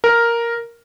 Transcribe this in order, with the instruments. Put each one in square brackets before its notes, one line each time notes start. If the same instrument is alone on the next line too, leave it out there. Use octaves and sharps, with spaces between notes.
[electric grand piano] A#4